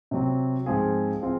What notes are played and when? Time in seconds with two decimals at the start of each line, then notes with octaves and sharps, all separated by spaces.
0.11 C3 F#3 C4
0.66 G#2 F3 C4 F4 G#4
1.21 F3 C4 F4 G#4